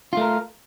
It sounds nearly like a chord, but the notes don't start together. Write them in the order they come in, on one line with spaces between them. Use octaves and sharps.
F4 A3 A#4